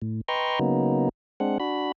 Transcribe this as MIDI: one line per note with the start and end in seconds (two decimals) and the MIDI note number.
0.02 0.21 45
0.28 0.59 71
0.28 0.59 75
0.28 0.59 79
0.28 0.59 82
0.28 0.59 84
0.28 0.59 85
0.60 1.09 49
0.60 1.09 54
0.60 1.09 58
0.60 1.09 59
0.60 1.09 63
1.40 1.58 56
1.40 1.58 60
1.40 1.58 62
1.40 1.58 78
1.60 1.92 62
1.60 1.92 66
1.60 1.92 83